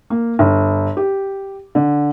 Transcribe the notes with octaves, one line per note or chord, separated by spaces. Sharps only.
A#3
G1
G4
D3